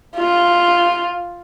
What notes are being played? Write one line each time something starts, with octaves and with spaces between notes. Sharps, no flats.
F4